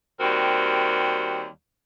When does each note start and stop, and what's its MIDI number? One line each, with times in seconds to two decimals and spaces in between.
0.20 1.46 39
0.20 1.46 55
0.20 1.46 60
0.20 1.46 66
0.20 1.46 70